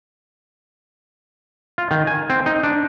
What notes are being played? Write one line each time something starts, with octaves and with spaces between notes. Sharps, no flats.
F4
D#3
G#5
C4
D#4
D4